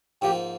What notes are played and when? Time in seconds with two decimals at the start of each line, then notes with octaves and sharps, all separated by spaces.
0.22 G#2 F3 A#3 G4